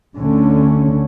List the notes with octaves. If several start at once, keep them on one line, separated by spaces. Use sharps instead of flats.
D2 D3 A3 C#4